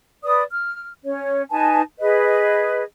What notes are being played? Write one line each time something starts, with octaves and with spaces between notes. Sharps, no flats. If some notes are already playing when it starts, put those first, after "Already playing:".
B4 D5 D#6
F6
C#4 C#5
D#4 B4 G#5 A5
G#4 B4 D#5